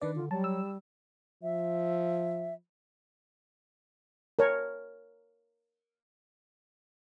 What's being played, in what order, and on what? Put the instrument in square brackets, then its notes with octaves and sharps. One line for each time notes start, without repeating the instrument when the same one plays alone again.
[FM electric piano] D#3 D4 D5 [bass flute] B4
[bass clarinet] D3 [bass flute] F4
[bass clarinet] F#3 [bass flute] G3 [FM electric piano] A5
[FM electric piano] E6
[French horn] F3 [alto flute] E5
[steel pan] A#4 C#5